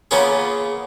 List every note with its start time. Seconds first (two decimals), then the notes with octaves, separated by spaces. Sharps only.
0.11 C#3 A#3 B3 C#4 F4 G#4